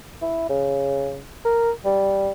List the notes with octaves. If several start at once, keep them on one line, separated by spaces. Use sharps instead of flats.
E4
C#3
A#4
G3